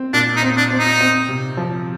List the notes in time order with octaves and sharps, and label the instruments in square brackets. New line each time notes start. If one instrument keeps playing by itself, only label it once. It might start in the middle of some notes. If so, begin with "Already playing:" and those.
Already playing: [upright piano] C4
[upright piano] A#2 [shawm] D4
[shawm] D#4
[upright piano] C4
[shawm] D4
[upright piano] C4
[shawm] D#4
[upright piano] C4
C3
F3